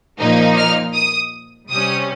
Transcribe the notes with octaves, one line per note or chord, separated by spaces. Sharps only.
A#2 F3 A#3 D#4
F6
D#6
C3 G3 C#4 D#6